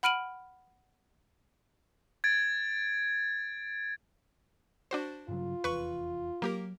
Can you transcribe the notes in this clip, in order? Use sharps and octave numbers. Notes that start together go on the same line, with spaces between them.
F#5 B5 F6 D7 D#7 F#7
G#6 A6 D7
D4 F#4 C5
G2 C#3 F#3 F4
F1 E2 B4 C#6
F#3 A#3 G4 A#4